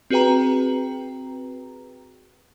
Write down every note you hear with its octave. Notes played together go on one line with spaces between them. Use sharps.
C4 F#4 G#4 B4 G5 A#5